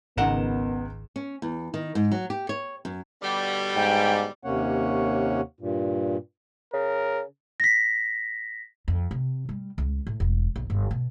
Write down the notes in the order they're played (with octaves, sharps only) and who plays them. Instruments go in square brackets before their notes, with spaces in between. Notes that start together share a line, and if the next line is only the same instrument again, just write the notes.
[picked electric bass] G#1 [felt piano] C#2 D#4 E7 [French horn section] B3 [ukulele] A#4 D#5 F#5
[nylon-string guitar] C#4
E2
D#3
G#2
F#3
G4
C#5
F#2
[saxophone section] B2 D3 G3
[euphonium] G#2 [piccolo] G5
[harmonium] D#2 C3 A#3 C#4 C#5 F#5
G2 A#2
[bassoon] C#3 [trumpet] A#4
[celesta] A#6 B6
[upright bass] F2
C3
G3
C#2
A2
E1
A#1
G1
B2